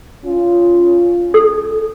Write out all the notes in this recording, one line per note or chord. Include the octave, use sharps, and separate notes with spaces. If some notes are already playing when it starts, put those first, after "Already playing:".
C#4 F4
A4